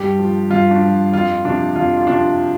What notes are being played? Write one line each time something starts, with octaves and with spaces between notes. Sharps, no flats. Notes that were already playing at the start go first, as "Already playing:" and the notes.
Already playing: G2 G4
F3
G2 F4
D4
F3
F2 F4
C3 F3 D4
F2 F4
F4
C3 F3 D4